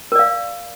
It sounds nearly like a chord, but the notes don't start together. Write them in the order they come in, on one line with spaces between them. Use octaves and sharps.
A#4 D5 F5